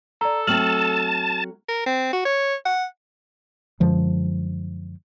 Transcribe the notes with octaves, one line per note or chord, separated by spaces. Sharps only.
A4 D5 A#5
F#3 A3 C4 A5 F6 F#7
A#4
C4
F#4
C#5
F#5
F#2 D3 F3 G#3